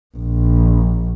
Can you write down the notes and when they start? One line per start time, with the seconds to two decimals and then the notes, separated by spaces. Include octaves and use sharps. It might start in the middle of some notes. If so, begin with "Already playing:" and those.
0.17 A#1